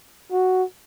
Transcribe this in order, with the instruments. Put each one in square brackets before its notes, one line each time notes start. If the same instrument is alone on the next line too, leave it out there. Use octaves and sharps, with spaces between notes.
[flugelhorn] F#4